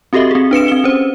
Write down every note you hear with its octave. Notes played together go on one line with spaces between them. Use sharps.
C4 F#4 G4 A4 D#5 E5
C4 G#4
D4 B4 C#7 E7
C4 G7
C#4 C5